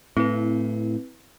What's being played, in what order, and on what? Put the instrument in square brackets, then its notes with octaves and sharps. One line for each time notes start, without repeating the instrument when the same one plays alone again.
[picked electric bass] A2 [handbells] C4 E4 B4